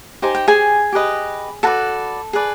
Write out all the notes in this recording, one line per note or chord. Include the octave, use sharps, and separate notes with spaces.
D#4 G4 C5 G#5
G5
G#4 G#5
G4 B4 D#5
F#4 A4 B4 D5 A5
G#4 B4 D5